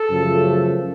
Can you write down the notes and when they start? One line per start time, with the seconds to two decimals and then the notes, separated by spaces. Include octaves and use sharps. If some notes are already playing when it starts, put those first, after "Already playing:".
Already playing: A4
0.11 F#2 C#3 F3 A3